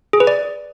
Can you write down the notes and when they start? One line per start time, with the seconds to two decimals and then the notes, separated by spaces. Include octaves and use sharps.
0.13 G#4
0.20 B4
0.27 D5